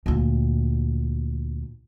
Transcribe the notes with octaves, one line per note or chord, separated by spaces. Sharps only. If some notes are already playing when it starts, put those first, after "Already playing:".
D2 A#2